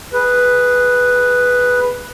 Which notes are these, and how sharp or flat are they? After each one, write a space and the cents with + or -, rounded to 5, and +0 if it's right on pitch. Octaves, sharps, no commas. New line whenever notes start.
G#4 +0 B4 +0